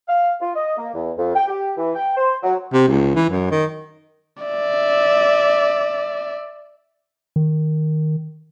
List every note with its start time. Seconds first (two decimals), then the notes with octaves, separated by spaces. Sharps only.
0.09 F5
0.41 F4
0.55 D#5
0.77 A#3
0.94 E2
1.17 F2
1.35 G5
1.48 G4
1.77 E3
1.94 G5
2.16 C5
2.43 F#3
2.73 C3
2.88 C#2
3.15 E3
3.30 F#2
3.51 D#3
4.43 D5 E5
7.36 D#3